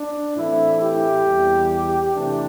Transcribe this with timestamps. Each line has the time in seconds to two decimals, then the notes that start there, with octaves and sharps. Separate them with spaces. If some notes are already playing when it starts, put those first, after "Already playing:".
Already playing: D4
0.36 A2 E3 A3 C4 E4
0.81 G4
1.25 E2 E3 G3
2.15 C3 E3 A3 D4